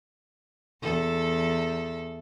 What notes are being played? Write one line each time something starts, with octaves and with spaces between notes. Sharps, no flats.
E2 A4